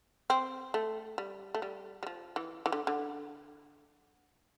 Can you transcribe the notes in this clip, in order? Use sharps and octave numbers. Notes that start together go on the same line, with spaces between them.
C4
A3
G3
A3
G3
G3
F3
E3
E3
D3
D3